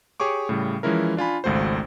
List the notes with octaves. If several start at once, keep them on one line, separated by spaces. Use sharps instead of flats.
G4 G#4 C#5 C#6 D6
A2 C#3 G3
E3 F3 G#3 C#4 E4 A#4
D4 F4 G#5 B5
G#1 C#2 A3 F#4 C5